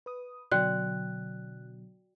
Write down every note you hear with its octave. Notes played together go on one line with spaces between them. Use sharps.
B4 D#6
B2 D3 F#3 F#4 D5 G5 F#6